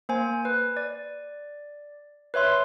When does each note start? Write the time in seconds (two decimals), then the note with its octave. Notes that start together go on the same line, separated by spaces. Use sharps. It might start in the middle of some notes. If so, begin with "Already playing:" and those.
0.09 A#3 C5 G#5
0.45 B4
0.77 D5
2.34 B4 C#5 E5 C6